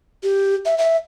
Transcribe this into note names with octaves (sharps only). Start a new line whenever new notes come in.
G4
E5
E5